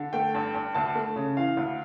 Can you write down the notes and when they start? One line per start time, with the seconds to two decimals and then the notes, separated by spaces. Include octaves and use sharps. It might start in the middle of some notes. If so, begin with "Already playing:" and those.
Already playing: D3
0.13 A3 G5
0.34 G2
0.55 G2
0.75 D2 A5
0.95 A3
1.16 C#3
1.37 E3 F5
1.57 D2